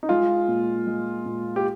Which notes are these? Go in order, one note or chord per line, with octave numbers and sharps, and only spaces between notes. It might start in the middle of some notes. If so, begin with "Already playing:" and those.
D#4
G#3 F4
A#2
G#3
A#2
G4